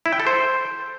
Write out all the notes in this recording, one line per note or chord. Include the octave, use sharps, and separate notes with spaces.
E4
G5
A4
C5